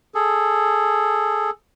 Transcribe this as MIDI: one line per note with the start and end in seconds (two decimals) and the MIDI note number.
0.15 1.50 68
0.15 1.50 69